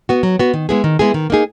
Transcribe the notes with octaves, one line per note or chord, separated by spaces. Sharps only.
B3 F#4
F#3
B3 F#4
D#3
G#3 B3 E4 G#4
D#3
G#3 B3 E4 G#4
D#3
A#3 D#4 G#4